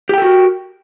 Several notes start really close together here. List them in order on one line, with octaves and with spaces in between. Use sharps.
G4 G5 A4 F#4 A#4